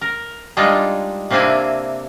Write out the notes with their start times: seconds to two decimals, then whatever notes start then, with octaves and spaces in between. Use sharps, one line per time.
0.01 A#4
0.57 G3 G#3 D4 D#4 F4
1.30 C3 A#3 C4 D4 E4 G#5